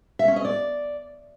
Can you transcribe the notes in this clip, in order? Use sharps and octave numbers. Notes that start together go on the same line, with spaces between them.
E5
C#4
D#5
D5